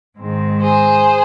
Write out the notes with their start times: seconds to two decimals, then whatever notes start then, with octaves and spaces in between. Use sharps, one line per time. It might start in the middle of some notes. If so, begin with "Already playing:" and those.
0.17 G#2 D#3 G#3 C4
0.61 G#4 C5